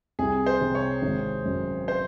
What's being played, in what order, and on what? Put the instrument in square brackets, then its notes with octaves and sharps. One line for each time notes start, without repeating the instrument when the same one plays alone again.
[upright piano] C2 [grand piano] G#4
[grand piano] C5
[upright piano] C3
[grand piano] C#5
[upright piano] G#1
F#2
[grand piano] C5